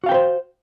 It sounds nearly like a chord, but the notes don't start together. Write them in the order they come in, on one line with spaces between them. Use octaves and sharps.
F#4 F5 G5 B4 C5